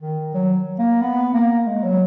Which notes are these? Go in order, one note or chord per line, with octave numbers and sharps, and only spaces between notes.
D#3
F#3
A#3
B3
A#3
G#3
F#3